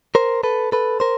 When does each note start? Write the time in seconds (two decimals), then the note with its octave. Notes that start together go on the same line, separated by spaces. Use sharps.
0.15 A#4 C5
0.43 A4 B4
0.72 A4 B4
1.00 A#4 C5